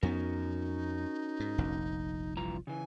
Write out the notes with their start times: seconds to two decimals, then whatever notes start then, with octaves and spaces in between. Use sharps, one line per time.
0.03 F2 B3 C#4 D#4 F#4 A#4
1.40 G#2
1.58 F1 A#1 F2
2.37 G2 E3 F4 A#5
2.67 C#3 E3 G#5